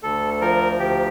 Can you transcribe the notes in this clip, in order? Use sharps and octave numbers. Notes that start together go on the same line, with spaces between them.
D2 A4
F3 A#4
D2 G4